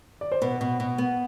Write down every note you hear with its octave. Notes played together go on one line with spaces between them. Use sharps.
D5
C5
B2 B4
B2
B2
B3